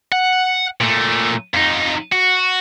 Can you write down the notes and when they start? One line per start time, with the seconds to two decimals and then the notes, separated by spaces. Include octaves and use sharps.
0.12 F#5
0.80 A#2 A3
1.54 F2 D#4
2.12 F#4